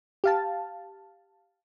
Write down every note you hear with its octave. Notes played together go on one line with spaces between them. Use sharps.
G4 F5 A5